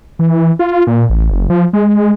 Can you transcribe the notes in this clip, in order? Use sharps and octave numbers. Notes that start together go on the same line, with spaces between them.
E3
F4
A#2
A1
F#1
F3
G#3